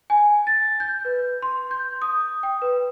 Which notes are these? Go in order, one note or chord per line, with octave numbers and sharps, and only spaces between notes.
G#5
A6
G6
B4
C6
G6
D#6
G5
B4